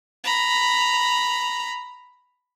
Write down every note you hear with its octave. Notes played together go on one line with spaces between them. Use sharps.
A#5 B5